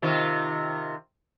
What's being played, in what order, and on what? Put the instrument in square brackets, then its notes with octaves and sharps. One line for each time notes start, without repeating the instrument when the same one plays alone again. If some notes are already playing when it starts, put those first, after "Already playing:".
[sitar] C3 D#3 F4